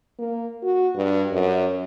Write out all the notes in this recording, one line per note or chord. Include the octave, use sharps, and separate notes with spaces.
A#3
F#4
G2
F#2